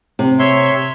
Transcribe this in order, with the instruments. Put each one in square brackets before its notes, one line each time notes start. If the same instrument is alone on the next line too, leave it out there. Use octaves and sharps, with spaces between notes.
[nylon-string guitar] C3
[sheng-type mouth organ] C#5 E5 C6